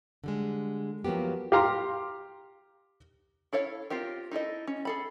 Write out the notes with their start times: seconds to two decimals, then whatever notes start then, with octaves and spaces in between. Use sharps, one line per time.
0.24 D3 G3 G#3
1.05 F3 F#3 A#3 B3 G4
1.52 G4 F5 A#5 C6
3.53 E4 A4 C#5 F5
3.90 C4 F4 G4 A#4
4.31 D#4 E4 A4 D#5
4.67 C#4
4.85 G#4 A4 B5